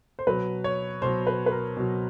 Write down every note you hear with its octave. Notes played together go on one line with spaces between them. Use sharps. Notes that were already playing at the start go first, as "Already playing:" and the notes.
C5
B2 F#3 B4
C#5
B2 F#3 C5
B4
B4
A#4
B2 F#3